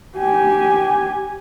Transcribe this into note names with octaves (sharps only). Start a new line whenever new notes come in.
G4 G#5